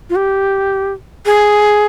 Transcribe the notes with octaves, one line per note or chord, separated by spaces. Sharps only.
F4
G4
G#4